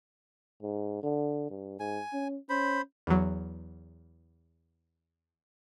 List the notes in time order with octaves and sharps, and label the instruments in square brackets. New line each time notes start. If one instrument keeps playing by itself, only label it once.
[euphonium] G#2
D3
G2
[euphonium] G#2 [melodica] G#5
[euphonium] C#4
[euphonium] C#4 [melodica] C5 B5
[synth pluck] E2 F#3